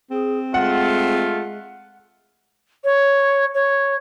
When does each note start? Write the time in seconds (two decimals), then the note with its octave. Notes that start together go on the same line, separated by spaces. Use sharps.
0.11 C4 G#4
0.54 G#3 A3 F4 F#5
2.84 C#5
3.54 C#5